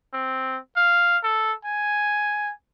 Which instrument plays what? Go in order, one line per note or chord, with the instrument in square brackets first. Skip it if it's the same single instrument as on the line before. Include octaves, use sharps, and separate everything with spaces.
[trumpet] C4
F5
A4
G#5